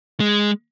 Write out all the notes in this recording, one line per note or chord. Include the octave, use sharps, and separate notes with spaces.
G#3